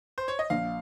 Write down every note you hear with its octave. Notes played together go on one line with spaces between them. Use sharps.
C5
C#5
D#5
A#1 F5